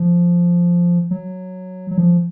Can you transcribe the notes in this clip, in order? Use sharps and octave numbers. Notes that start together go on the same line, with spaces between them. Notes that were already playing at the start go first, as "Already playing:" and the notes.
Already playing: F3
F#3
F#3
F3